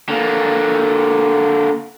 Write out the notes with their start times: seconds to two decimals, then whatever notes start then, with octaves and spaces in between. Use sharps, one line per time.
0.09 D3 A#3